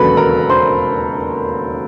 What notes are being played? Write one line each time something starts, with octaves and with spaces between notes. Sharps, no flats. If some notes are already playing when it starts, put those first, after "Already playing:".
Already playing: E1 D#2 C#3 F#3 A4 B4 B5
A#4 A#5
C5 C6